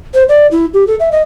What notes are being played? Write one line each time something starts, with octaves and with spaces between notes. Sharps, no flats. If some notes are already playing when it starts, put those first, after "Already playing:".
C5
D5
E4
G4
A4
E5
D#5